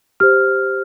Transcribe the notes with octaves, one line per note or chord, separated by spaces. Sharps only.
G4 C5 F6